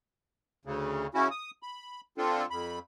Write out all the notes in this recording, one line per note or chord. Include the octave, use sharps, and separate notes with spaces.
D2 C#3
C#3 C#4 E4 F#4
D#6
B5
D3 C4 D4 F4 A4
F2 B5